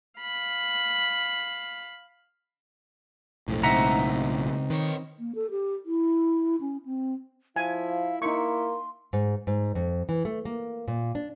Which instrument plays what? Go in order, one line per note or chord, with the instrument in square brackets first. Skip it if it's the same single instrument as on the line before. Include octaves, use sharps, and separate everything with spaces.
[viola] F5 B5
[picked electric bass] B1 A2 [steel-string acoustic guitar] F2 D3
[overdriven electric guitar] C#2 [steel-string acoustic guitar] C4 D#4 [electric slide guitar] E5 F#5 A#5
[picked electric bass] D#3 [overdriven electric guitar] B4 C#5
[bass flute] A#3
A4
G4
E4
C#4
C4
[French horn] F3 [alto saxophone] E4 [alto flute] F5 [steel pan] G#5
[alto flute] F5
[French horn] A#3 [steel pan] D#4 C#6 [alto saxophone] E4 [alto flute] C6
[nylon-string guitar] G#2
G#2
F2
E3
A3
A#3
A#2
D4